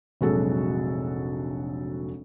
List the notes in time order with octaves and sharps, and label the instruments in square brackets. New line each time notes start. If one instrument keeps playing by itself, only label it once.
[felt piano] F1 A#1 F#3 G#3 F#4 A4